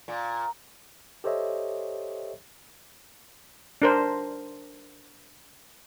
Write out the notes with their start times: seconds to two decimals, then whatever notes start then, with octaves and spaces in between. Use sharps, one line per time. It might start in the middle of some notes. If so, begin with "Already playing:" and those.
0.08 A#2
1.24 G4 A4 C5 C#5 D#5 E5
3.82 D4 A#4 C5